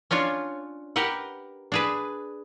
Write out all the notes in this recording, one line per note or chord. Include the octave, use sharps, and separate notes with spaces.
C#4 D4 F4 C#5
G4 A#4 B4 F#5
D4 G#4 B4